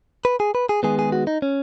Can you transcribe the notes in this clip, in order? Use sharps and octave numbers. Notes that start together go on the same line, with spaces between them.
B4
G#4
B4
G#4
D#3 G#3 B3 G#4
G#4
F#4
D#4
C#4